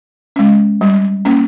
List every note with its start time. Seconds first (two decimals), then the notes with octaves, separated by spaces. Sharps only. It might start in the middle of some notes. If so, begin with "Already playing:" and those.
0.36 G#3 C#4
0.81 G3
1.25 A#3 C#4